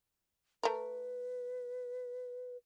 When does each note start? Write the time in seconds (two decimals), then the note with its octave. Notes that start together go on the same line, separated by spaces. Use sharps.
0.63 A3 A#4 B4